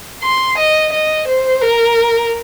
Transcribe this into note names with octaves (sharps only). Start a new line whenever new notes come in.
C6
D#5
D#5
C5
A#4